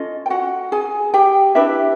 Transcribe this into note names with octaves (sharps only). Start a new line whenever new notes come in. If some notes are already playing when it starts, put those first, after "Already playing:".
Already playing: C#4 F4 A4 D#5
G5
F#4 F#5
G#4 G#5
G4 G5
D4 E4 G4 B4 E5